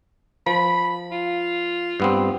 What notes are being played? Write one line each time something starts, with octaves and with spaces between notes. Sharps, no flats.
F3 B5
F4
G2 B3 C4